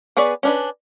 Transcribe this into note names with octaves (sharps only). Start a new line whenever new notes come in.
B3 G#4 B4 C#5 D5
C#4 D4 B4